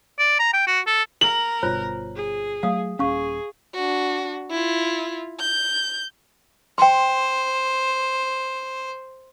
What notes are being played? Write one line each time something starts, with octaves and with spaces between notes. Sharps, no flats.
D5
A#5
G5
F#4
A4
A#4 F#7
G1 B2 F4 C5 C#5
G#4
F#3 A3 F5 D#6
D#1 C#4 G#4 F5 C#6
D4 F#4
E4 F4
G6
C5 G5 C6